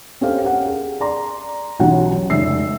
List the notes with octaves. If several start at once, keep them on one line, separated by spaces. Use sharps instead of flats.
C4 C#4 G4 A4 C5 F5
G4 A#4 F#5
G#4
D5 A#5 C6
B1 E3 F#3 G3 C#4 F#5
F1 C#2 E5 E6 C7